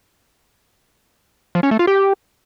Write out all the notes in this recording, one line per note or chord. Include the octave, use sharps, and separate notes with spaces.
F3
C#4
A3
F4
G4